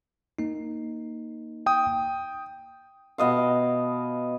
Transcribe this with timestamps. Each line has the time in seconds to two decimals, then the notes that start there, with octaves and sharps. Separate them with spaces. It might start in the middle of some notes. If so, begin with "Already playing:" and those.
0.39 A#3 D#4
1.66 G5 D#6
3.18 B2 D#5 F5